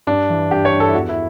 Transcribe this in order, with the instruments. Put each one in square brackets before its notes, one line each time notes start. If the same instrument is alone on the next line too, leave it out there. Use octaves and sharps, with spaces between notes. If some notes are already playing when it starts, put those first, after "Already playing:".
[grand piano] G2 D4
E3
G2 G4
C#5
G2
A4
E4
E2 F#4
E4